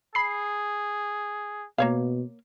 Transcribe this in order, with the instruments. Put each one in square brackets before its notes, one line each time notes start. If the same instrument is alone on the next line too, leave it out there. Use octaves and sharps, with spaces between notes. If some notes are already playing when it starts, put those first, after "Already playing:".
[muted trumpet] G#4 [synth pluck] B5 C7
[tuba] B2 [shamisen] A#3 C#5 F5